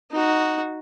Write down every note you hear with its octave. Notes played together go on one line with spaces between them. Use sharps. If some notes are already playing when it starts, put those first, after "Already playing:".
D#4 F#4